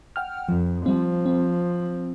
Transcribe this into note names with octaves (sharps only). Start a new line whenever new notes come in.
F#5 G5 F6
F2 F3
F3 G3 C4
C4